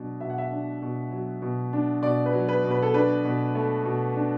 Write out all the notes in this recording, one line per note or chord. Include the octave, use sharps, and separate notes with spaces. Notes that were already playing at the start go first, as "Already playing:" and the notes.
Already playing: B2 F#3 D4
B2 E5
F#5
E5
D4
B2
F#3
B2
D4
B2 D5
B4
F#3
B4
B2
B4
A4
D4 B4
B2
A3
B2
D4